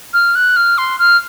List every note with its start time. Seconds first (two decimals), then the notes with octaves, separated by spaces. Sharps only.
0.13 F6
0.35 F#6
0.56 F6
0.78 C6
0.99 F6